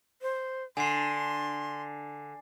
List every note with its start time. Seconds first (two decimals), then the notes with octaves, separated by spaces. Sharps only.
0.22 C5
0.77 D3 G#5 C6 C7